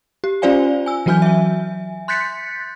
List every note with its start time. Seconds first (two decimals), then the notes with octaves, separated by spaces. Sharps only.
0.24 G4
0.42 C#4 F4 C5 D5 F5 G#5
0.86 G#5 E6
1.06 E3 F#3 F#4 G#5 F6 G6
1.22 E5 G#5
2.08 C6 F#6 G6 A6 B6 C#7